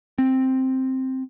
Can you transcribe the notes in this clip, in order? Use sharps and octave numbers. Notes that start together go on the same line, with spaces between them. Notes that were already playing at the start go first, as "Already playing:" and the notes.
C4